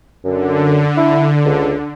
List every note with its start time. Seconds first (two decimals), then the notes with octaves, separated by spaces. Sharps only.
0.24 F#2 D3
0.97 E4
1.45 C#2